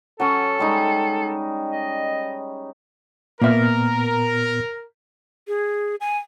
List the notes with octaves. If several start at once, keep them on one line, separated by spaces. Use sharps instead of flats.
F#3 C#4 A4
G3 G#3 D#4
D#5
A#2 A#3 B3 A#4 E5 F6
G#4
G#5